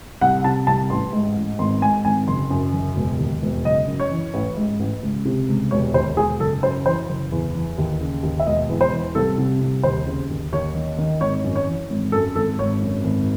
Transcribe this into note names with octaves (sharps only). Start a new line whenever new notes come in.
C2 F#5
C3 A5
C2 A5
A1 C6
G#2
A1
G#1 C6
G#2 G#5
G#1 G#5
F#1 C6
F#2
F#1
E1
D#2
E1
F#1 D#5
F#2
C#5
E3
A1
G#2
A1
C#2
C3
C#2
E1 C#5
D#2 C5
E1 G#4
F#1 A4
F#2 C5
E3 C5
F#1
E2
E3
D#2
C#3
D#2
E5
E1 D#5
E2
C5
E3
C2 A4
C3
C2
D#2 C5
C#3
D#2
D#2 C#5
D#3
D#3
G#1 C#5
F#2
C#5
E3
G#1
F#2 A4
G#1 A4
G#1 C#5
F#2
G#1